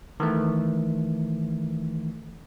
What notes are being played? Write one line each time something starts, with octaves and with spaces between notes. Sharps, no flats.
D#3 E3 A3